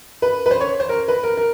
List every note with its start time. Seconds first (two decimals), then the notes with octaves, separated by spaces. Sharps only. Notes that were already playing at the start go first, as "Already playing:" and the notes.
0.22 B4
0.46 B4
0.51 C5
0.61 C#5
0.80 C5
0.89 A#4
1.08 B4
1.23 A#4
1.37 A#4